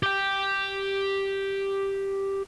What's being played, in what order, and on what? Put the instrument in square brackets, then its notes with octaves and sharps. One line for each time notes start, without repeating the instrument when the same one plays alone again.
[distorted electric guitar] G4 G5